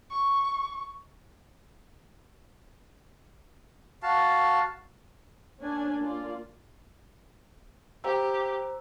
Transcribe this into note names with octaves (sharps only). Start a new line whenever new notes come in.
C#6
F#4 F5 A5
A#3 C#4 D4 G#5
A#3 F4 D5
G4 C5 A#5 E6